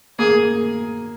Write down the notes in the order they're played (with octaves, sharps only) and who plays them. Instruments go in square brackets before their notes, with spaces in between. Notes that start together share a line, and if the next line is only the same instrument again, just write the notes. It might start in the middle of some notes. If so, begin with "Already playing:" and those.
[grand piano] A#3 [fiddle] G#4